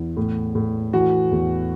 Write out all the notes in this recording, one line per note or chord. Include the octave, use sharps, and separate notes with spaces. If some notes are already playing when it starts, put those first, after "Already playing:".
Already playing: E2 E4
A2
A2
E3 F#4
E2